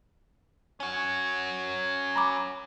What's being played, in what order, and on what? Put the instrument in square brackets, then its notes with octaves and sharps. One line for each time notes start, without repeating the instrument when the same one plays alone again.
[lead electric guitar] C#4 F#4 [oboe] C#5
[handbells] A#5 B5 D6